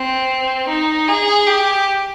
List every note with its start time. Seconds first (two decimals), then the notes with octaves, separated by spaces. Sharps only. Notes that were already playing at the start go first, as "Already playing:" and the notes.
Already playing: C4
0.68 D#4
1.08 G#4
1.47 G4